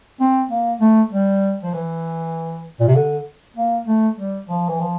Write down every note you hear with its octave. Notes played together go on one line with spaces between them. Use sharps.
C4
A#3
A3
G3
F3
E3
A#2
C3
D3
A#3
A3
G3
F3
E3
F3